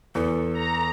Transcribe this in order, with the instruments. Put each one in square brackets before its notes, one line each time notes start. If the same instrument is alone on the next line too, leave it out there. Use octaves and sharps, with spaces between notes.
[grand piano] E2 [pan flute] A4
[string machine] A#5